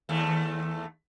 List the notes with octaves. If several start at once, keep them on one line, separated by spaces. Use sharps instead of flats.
D#2 A3